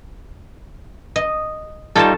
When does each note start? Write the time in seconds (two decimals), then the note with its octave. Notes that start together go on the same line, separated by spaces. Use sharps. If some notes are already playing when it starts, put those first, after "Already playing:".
1.16 D#5
1.96 G3 D#4 F4 A4 C#5 A5